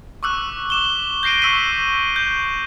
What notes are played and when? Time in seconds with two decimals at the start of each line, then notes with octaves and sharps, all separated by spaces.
0.23 C#6 D6 E6 F#6
0.70 D6 E7 G7
1.23 G6 A#6 C7 D7 D#7
1.42 C#6 E6 B6 D#7
2.16 G6